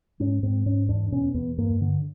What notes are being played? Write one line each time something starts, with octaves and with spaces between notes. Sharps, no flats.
G#2 C#4
G#2 C4
G#2 C#4
E2 D4
B2 C#4
E2 B3
G2 A#3
D3